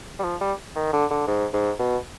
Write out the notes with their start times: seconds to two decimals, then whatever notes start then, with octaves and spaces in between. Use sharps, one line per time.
0.19 G3
0.24 F3
0.41 G3
0.76 D#3
0.93 D3
1.10 D3
1.27 G#2
1.53 G#2
1.79 B2